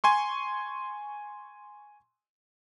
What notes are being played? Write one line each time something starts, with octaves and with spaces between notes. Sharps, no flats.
G#5 C6 C#6